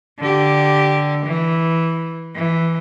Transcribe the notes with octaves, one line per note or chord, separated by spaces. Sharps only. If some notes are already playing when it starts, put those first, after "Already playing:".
D3 G4
E3
E3